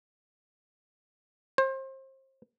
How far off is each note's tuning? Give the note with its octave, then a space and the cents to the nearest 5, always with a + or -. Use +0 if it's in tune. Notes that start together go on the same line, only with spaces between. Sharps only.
C5 +30